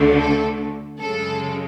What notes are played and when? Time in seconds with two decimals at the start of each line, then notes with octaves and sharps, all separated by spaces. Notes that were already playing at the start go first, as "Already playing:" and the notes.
Already playing: D2 D3 A3
0.17 A4
1.00 F#2 C#3 G#3 A4